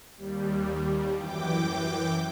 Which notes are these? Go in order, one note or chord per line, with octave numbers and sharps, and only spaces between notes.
D#2 G3
F#2 E3 G5 D6